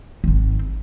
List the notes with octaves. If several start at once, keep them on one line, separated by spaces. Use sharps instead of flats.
G#1 C4